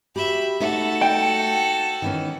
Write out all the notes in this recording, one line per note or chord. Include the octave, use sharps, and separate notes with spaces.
F#4 G4 E5 B5
A3 D#4 F#4 A4 E5
G5
D#3 E3 C#4